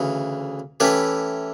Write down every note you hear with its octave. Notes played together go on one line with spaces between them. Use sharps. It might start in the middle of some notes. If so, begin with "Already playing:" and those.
Already playing: D2 C#3 E3
E3 A3 C#4 G4 B4